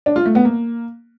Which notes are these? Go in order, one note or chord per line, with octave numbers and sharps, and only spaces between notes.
D4
F4
A3
B3
A#3